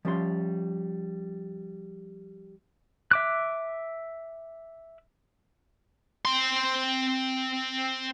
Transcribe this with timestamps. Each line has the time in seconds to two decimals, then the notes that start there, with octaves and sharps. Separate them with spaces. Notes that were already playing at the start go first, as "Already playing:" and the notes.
0.05 F3 G3 C#4 E5 A#5 C6
3.11 E5 D6 F#6
6.25 C4 C6